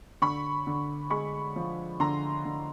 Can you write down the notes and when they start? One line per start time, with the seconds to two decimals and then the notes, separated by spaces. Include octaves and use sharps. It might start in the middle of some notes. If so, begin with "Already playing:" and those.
0.22 D3 B5 C#6
0.67 D3
1.10 G#3 B5 C#6
1.56 F3
2.00 D3 A#5 C6
2.45 D3